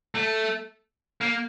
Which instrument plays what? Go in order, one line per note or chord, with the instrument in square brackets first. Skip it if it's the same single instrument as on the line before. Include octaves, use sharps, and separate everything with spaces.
[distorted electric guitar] A3
A#3